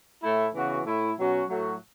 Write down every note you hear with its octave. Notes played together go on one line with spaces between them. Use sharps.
A2 A3 E4
C#3 E3 B3 F#4
A2 A3 E4
B2 F#3 C#4 F#4
A2 F#3 A3 F#4